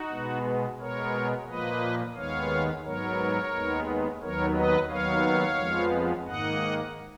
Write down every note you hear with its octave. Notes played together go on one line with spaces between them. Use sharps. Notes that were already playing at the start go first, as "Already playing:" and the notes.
Already playing: D#4 F#4
B2 G#3 B3
B2 G#3 B3 A#4 C#5
A#2 F3 A#3 B4 D#5
D#2 D#3 G#3 B3 C#5 F5
G#2 F#3 B3 A#4 C#5
D#2 D#3 G#3 B3
D#2 D#3 F#3 B3 A#4 C#5
B4 D#5
D#2 D#3 F#3 B3 C#5 F5
F2 F3 G#3 B3
G#2 D#3 A#3 D#5 F#5